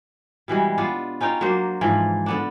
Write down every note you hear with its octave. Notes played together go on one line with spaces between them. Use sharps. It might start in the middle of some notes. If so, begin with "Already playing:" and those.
B2 E3 G3 G#3
B3 D4 F4
C#4 D#4 F4 G5
F#3 A#3 D4 C5
G#2 E3 F3
D3 B3 D4